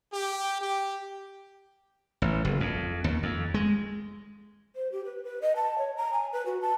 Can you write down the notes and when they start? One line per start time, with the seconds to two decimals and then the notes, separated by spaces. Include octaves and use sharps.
0.13 G4
0.61 G4
2.22 A1
2.45 F#1
2.60 F2
3.04 D#2
3.23 F2
3.54 G#3
4.76 C5
4.92 G4
5.05 B4
5.24 B4
5.42 D#5
5.56 A5
5.78 C#5
5.97 A#5
6.13 G#5
6.33 B4
6.46 F#4
6.61 A5